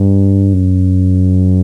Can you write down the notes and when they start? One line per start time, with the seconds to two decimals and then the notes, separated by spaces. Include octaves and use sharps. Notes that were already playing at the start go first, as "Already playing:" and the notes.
Already playing: G2
0.53 F#2